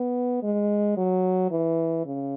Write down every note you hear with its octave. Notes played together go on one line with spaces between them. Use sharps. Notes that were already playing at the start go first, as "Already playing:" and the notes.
Already playing: B3
G#3
F#3
E3
C#3